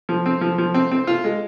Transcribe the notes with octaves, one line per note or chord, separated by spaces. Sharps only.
F3
C4
F3
F3
C4
C4
F4
G#3